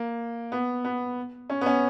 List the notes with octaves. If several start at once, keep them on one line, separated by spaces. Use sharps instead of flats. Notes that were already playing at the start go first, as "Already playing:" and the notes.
Already playing: A#3
B3
B3
C#4
B3
C#4